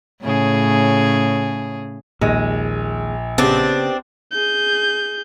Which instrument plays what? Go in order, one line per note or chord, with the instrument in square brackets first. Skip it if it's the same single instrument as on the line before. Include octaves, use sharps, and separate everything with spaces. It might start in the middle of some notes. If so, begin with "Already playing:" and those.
[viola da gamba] A2 C#3 G#4
[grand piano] A#1 [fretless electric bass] D#2 [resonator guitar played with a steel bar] G#3
[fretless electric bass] C#3 [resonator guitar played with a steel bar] B3 G4 [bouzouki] C4 D4
[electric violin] G#4 G6